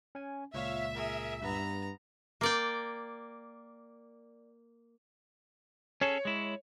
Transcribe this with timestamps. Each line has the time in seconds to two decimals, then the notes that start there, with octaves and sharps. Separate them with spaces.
0.15 C#4 G#5
0.54 C#2 A#2 C#5 E5 F5
0.95 G#4 A#4
1.42 G2 B3 A#5
2.41 A#3 D5 G5
6.01 C#4 G#4 A4 C#5
6.25 G#3 E4